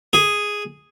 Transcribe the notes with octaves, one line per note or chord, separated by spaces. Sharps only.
G#4